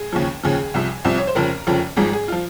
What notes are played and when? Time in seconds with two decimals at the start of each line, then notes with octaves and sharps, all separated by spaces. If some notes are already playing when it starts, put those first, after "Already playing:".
Already playing: G#4
0.13 D#2 C#3 F3
0.43 D#2 C#3 F3 G#4
0.74 C2 C3 F3
1.05 C2 C3 F3
1.18 C#5
1.27 C5
1.35 F1 F2 C#3 F3 A#4
1.67 F1 F2 C#3 F3
1.97 G#1 G#2 F3 G#4
2.13 G#4
2.28 F3 F4